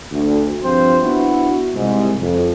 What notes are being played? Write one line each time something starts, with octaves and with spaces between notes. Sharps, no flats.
D2
G2 F3 C4 F4 C5
B3 D4 E4 F#4
C2 G#2
F2